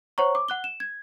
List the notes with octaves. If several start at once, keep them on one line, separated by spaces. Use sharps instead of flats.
C5 C#5 F#5 A#5 C#6
D6
F#5 F#6 G7
E7
G#6